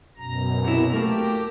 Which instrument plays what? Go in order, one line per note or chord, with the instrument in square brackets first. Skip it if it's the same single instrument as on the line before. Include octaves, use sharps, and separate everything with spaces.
[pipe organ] F#2 B2 A#5
[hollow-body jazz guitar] C3 E4
[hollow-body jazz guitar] A3 A#3 [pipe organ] G4